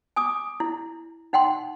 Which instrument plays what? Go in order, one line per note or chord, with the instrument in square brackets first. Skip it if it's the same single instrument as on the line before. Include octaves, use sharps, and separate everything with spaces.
[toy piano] G#5 D6 D#6
E4
D#4 F#5 G5 C6